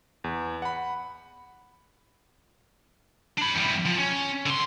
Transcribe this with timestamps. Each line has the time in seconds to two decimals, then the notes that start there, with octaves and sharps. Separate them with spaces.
0.24 E2
0.62 F#5 B5
3.38 D4 B5
3.55 E2 G3
3.86 F3
3.98 C#4
4.46 D3 C6